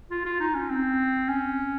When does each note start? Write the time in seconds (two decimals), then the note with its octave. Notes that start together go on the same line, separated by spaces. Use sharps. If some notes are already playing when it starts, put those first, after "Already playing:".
0.11 F4
0.25 F4
0.40 D#4
0.55 C#4
0.70 C4
1.29 C#4